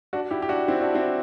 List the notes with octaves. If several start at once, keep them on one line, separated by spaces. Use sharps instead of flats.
D4 F#4
E4 G4
G4
D4 F#4
C4 E4
D4 F#4
C4 E4